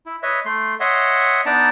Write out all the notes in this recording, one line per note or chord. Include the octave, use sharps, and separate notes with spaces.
E4
B4 C#5 D#5 E5
A3 C6
C#5 D#5 E5 F#5 C6
B3 D4 D#4 D5 A5 A#5